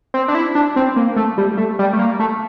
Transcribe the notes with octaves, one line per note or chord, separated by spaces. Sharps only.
C4
D4
E4
D4
C4
A#3
A3
G3
A3
G3
A3
A#3
A3